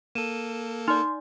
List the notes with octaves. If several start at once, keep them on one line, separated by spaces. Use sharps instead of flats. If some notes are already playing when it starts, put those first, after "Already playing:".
A#3 A4 D#7 E7
D#4 D5 C6